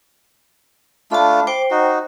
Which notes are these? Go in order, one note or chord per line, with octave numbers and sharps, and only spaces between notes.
A3 D4 F4 A5 B5
C5 G5 D6
D#4 F#4